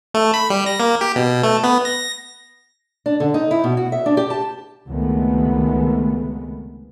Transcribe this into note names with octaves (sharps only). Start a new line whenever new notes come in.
A3
B5
G3
A#6
A#3
G4
B2
A3
B3
A#6
D4
D3
D#4
E4
B2
F#4
E5
D4
G4
A5
C#2 C3 D#3 G#3 A3 B3